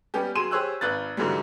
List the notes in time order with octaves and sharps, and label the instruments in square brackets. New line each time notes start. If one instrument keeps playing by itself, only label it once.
[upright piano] G3 B3 C#4 G4
F#3 G#4 C6 D#7 E7
G4 G#4 C5 C#5 E6 F#6
G#1 B4 F#6 A6
G#2 D3 E3 F#3 G3